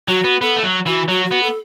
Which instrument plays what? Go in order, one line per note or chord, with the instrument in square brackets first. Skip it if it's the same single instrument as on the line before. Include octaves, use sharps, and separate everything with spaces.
[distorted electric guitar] F#3 [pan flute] F#4
[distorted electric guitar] B3
[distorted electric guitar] B3 [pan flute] A4
[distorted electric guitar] A3
F#3
[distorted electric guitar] E3 [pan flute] F#4
[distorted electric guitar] F#3 [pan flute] F#4
[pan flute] F#4
[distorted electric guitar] B3
[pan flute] A4